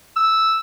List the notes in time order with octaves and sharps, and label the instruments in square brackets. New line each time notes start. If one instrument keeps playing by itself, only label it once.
[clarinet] E6